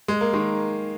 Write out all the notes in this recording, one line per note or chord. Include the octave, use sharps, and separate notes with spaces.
G#3
A#3
D#3 G#3